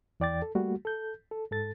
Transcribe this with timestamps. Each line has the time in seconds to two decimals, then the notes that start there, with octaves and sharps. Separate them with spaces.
0.20 E2 E3 D5 G5 D6 A6
0.42 A4
0.55 G3 A3 A#3 F#4
0.85 A4 G6
1.31 A4
1.51 G#2 A4 A6